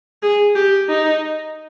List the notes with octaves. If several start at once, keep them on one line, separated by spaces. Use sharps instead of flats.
G#4
G4
D#4